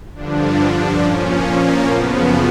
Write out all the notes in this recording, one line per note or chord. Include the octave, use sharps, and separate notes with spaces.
G2 D3 F3 D4
A#2 F3 C#4
A#3
F#2 C#3 F3 B3